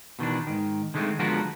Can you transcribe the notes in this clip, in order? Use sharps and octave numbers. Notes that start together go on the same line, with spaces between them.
B2 D#3 E3 D4
G#2 D#3
D3 D#3 G#3 A3 C4
D3 F3 G#3 B3 F#4 A#4